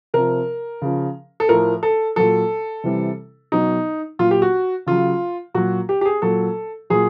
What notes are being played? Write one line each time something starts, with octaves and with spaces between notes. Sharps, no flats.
C3 F3 A#4
C#3 F3
A4
A2 F3 A#4
A4
A#2 F#3 A4
C3 E3 G3
B2 F#3 D#4
A#2 F#3 F4
G4
F#4
C#3 F#3 F4
A#2 F#3 F#4
G4
G4
G#4
A#2 F#3 A4
A#2 F#3 G#4